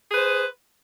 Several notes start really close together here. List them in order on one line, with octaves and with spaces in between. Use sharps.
G#4 B4 C5